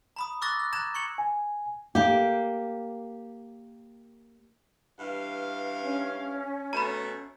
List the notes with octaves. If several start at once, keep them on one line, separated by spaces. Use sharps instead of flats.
A#5 B5 D#6
C#6 D6 E6 F#6 A6 A#6
F#6
A#5 F#6 G#6 E7
C#6 G#6 C#7 F#7
G#5
A#3 G4
G2 E3 F5
C#4
B2 A3 A#5 B5